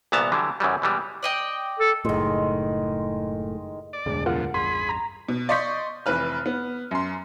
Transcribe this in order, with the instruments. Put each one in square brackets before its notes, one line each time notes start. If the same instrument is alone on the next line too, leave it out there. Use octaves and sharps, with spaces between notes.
[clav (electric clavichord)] C2 A#2 E3 B3 A5 A#5
D3 E3 F#3 G3
F#2 C#3 E3 F#3 G3
B2 E3 G3 G#3
[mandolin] D5 D#5 G5
[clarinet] A4
[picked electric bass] F#1 A2 [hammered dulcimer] D#3 G#3
[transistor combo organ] D5
[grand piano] E1 [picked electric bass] C#2 A2 D3
[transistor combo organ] B2 F3 [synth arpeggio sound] F4 A#4 F#5
[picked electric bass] A1 E2 G2 [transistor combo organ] G#4 B5 [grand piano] C6
[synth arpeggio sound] A#5
[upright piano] B2
D5 D#5 C6 C#6 G6 B6
F1 E3 B4 F6
B3
F#2 C6